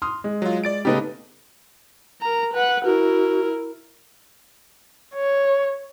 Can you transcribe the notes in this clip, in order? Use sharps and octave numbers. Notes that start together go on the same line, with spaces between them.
C6 D#6 F6
G#3
F#3 F4
D5 A6 D7
C#3 A3 B3 D#4 G4 B4
A#4 A#5
B4 F#5
E4 F#4 A#4
C#5